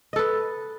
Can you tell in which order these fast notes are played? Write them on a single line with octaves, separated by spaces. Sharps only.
D#5 A4 B4